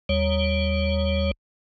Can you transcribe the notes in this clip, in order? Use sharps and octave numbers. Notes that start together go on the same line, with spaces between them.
D#2 G3 C#5